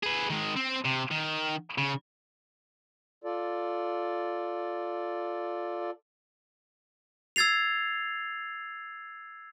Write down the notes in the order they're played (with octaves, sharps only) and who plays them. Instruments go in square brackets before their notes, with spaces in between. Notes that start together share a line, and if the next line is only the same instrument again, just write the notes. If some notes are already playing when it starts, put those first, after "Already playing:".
[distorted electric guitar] G#4 B4
D#3 G#3
C4
C3
D#3
C#3
[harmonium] F4 A4 D5
[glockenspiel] E6 G#6 A6 C7 F7